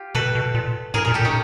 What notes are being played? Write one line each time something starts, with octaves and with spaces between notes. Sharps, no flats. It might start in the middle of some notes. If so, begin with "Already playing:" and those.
Already playing: F4 G4
B2 A4 B4
B2
A#2
A2 G#4 A#4
A#2 G#4 A#4
G4 A4
A#2
C#4 D#4